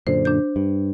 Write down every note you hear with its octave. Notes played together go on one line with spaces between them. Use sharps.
F#2 A#2 D3 C5
D4 G6
G2